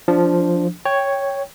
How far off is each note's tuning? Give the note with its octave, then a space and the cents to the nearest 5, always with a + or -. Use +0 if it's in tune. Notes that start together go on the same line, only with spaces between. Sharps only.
F3 +0 D4 +0
C#5 +0 G5 +5